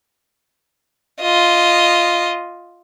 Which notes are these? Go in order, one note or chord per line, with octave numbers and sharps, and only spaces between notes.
F4 D#5